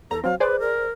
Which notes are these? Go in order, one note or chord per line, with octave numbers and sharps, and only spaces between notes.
E2 A4 A#5
F#3 C4 F5
G#4 B4 C5 D5
A#4